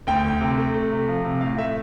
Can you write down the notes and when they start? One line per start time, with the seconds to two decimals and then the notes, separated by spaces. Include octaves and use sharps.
0.07 D2 G5
0.24 D2
0.41 C3
0.58 A3
0.74 A3
0.92 C3
1.08 F3
1.25 C3
1.41 A2 F5
1.57 A3 E5